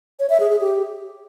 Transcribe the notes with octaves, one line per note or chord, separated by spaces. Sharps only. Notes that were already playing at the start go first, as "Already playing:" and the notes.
C#5
E5
G#4
G#4
G4